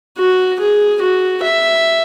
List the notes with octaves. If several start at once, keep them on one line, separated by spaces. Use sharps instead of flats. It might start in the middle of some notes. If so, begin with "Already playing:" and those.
F#4
G#4
F#4
E5